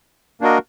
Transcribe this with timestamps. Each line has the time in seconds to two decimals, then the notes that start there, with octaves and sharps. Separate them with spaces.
0.41 A#3 D4 F#4 A#4 D#5